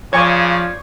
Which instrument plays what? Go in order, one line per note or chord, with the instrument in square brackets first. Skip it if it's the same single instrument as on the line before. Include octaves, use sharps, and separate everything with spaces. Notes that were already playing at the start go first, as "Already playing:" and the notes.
[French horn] C#3 [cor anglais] F3 [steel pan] C#5 G#5 [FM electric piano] D5 C#6 G#6